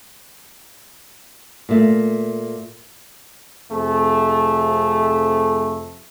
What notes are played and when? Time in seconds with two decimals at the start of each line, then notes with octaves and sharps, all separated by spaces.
1.69 A#2 A3
3.71 F2 C3 A3 G#4